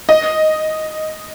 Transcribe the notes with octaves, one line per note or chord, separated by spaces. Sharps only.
D#5